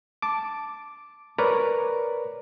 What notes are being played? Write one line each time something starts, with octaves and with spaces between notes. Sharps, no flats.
A5 D6
A#4 B4 C#5 D5 A#5